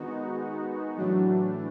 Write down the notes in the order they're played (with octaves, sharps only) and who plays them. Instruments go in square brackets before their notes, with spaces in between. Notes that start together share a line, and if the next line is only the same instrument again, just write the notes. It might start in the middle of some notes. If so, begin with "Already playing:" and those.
Already playing: [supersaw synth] D#3 G#3 B3 D#4 F#4
[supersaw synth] A2 E3 A3 D4 [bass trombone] F#3